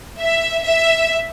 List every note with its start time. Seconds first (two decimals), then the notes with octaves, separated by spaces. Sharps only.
0.20 E5
0.64 E5